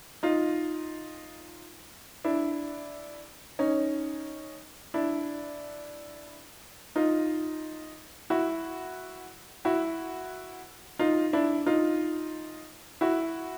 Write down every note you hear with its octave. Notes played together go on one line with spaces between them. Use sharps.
D#4 F4
D4 E4
C#4 D#4
D4 E4
D#4 F4
E4 F#4
E4 F#4
D#4 F4
D4 E4
D#4 F4
E4 F#4